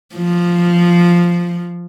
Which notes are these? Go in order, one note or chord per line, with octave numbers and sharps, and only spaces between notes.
F3